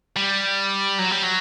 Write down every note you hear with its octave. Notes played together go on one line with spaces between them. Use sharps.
G3
F#3
G3
F#3